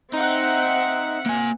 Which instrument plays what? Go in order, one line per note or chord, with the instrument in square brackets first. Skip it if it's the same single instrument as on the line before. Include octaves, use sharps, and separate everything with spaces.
[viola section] C4 E5 F#5 [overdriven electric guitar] D#4
[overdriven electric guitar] A#3 G#5